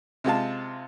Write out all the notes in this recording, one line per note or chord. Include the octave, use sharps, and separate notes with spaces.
C3 G#3 F4 A5